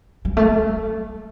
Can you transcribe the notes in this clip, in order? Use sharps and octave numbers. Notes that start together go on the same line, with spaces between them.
G3
A3
G3